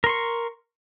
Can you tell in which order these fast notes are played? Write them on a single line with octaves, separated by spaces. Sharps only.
A#4 C6 C#6